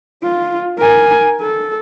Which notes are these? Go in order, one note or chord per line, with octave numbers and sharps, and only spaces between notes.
F4
A#4 G#5
A4